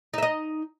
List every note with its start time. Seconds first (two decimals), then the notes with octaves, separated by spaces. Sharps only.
0.14 D#4
0.18 E5
0.23 D#5